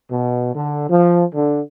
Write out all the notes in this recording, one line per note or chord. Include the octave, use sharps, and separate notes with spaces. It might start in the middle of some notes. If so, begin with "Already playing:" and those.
B2
D3
F3
D3